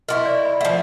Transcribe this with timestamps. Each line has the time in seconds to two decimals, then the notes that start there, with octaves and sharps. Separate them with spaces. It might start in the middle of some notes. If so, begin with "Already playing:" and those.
0.09 E4 F#4 A#4 D#5 C6 C#6
0.26 D5
0.45 B5
0.61 F3 A3 D5 F#5